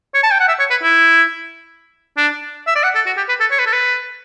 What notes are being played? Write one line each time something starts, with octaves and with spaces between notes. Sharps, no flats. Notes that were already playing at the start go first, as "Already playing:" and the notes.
C#5
A5
G5
F#5
E5
C#5
B4
E4
D4
E5
D5
F#5
A4
F#4
G4
B4
A4
C#5
B4
A4
B4